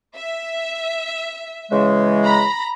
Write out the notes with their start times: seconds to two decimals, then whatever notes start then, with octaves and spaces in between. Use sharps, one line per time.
0.15 E5
1.71 C#3 E3 G#3
2.22 A#5 B5 A#6